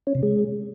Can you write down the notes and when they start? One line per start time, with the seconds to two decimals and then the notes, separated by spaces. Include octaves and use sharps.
0.07 C#4
0.15 C3
0.23 G#3